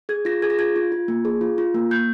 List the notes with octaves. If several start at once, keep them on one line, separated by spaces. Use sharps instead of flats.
G#4 G#6
F4 A#6
G#4 G#6
A#6
F4 G#6
F4
F4
A#3
G#4
F4
F4
A#3
A#3 G6